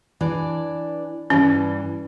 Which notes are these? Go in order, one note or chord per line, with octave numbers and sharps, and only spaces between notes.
E3 D4 D5
G2 E3 G3 C#4